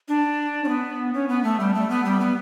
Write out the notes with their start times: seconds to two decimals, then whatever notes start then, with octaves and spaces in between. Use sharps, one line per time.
0.08 D4
0.64 C#4
0.68 B3
1.14 C#4
1.29 B3
1.44 A3
1.60 G3
1.75 A3
1.90 B3
2.05 G3
2.20 B3